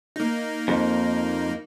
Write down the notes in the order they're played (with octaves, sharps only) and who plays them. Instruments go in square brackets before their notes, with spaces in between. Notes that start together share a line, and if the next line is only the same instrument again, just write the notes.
[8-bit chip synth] A#3 D#4
[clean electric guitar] F2